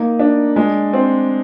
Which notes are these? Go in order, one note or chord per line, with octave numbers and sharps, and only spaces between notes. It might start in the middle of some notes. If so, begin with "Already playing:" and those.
Already playing: A#3 D#4
D4
G#3
C4